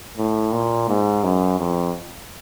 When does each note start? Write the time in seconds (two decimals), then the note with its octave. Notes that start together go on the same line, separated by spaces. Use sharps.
0.18 A2
0.53 A#2
0.89 G#2
1.24 F#2
1.60 F2